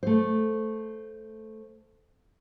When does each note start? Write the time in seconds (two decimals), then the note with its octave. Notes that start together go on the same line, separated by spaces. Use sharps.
0.03 A3 C5